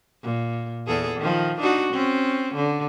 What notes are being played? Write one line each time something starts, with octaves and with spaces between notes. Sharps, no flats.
A#2
E2 G#4 A4
D#3 F3
D4 D#4 F#4
C4 C#4
D3